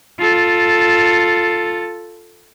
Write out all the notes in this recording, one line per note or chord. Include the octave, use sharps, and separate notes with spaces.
F4 A4